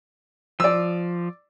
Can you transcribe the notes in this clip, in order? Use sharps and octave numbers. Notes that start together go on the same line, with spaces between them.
F3 D5 E6